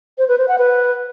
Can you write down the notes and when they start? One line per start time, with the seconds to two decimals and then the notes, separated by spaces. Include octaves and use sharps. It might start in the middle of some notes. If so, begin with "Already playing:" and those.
0.18 C5
0.28 B4
0.38 C5
0.48 F#5
0.58 B4